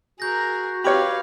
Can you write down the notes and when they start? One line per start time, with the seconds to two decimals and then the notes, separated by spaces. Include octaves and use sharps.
0.20 F#4 G#4 A#4 G6 A#6
0.84 G4 B4 C#5 F5 B5 D6 F6